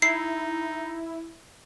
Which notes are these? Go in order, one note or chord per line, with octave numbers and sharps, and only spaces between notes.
D#4 E4 C7